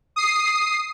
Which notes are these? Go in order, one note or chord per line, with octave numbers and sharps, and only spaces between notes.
D#6 C7